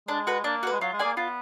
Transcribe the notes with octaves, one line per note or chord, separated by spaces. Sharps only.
G#3 D4
F#4 B4
A#3 D4
F#4 B4
G#3
F#3 F4
G#3
A#3 G#4 D5 G#5
B3 F4